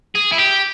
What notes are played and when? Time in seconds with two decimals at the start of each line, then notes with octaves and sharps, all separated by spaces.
0.15 G#4
0.32 E4
0.38 G4